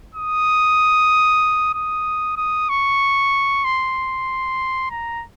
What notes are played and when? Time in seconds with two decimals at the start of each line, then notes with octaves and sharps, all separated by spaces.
0.15 D#6
1.74 D#6
2.37 D#6
2.69 C#6
3.65 C6
4.91 A#5